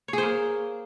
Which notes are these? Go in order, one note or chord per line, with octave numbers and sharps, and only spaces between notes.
A#3 G#4 C5 C#5